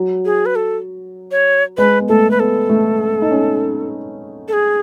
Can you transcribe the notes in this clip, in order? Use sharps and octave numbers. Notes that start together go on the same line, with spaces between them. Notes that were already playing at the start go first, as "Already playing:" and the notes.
Already playing: F#3
G#4
B4
A4
C#5
G#3 B4
B3
A3 A4
B4
B3 A4
A3
D#4
C#4
A4
G#4